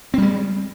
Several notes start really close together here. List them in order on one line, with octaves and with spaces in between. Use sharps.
C4 G3 G#3